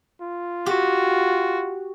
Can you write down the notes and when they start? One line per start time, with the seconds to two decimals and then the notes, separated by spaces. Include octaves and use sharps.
0.21 F4
0.66 F#4 G4